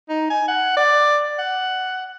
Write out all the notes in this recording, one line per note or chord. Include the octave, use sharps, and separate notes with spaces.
D#4
G#5
F#5
D5
F#5